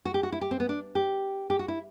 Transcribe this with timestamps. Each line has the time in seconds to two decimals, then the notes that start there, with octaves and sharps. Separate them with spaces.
0.05 F#4
0.14 G4
0.23 F#4
0.32 E4
0.41 G4
0.51 C4
0.60 B3
0.69 D4
0.95 G4
1.50 G4
1.59 F#4
1.68 E4